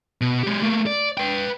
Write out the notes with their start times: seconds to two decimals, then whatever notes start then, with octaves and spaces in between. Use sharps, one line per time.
0.21 B2
0.43 G#3 G4
0.62 A3 A#3
0.87 D5
1.18 B4 G5